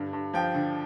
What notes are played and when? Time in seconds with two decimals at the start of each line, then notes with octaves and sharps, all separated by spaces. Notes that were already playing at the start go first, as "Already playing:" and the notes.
Already playing: G2 D3
0.13 G2
0.33 F3 G5
0.55 D3